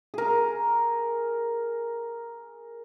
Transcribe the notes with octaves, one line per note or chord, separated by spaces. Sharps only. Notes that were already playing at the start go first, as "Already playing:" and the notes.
G#4 A#4